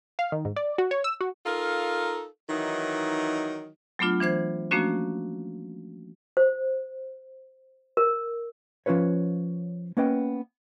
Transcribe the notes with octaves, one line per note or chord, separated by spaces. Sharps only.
F5
D#3
G#2
D5
F#4
C#5
E6
F#4
D#4 F4 A4 A#4 F5
D#3 E3 F#3 D#4
F#3 A3 B3 D4 F4
E3 D4 C5 G#6
F3 A3 A#3 C#4 D4 F#4
C5
A#4
F3 C#4 F4 B4 C#5
A#3 B3 C#4 B4 D#5 G5